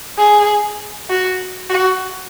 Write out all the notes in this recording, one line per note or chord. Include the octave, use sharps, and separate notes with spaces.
G#4
F#4
F#4